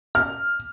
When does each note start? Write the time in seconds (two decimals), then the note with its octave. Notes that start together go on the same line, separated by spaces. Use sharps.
0.15 F6